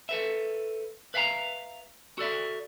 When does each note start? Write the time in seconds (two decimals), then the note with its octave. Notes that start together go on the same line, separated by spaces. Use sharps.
0.09 A4 B4 E5
1.14 B4 E5 F5 G5 A#5
2.18 F#4 A4 D5 E5